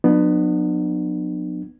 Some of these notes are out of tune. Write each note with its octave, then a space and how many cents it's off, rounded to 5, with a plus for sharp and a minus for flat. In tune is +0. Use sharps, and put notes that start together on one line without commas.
F#3 -45 B3 +0 D4 +40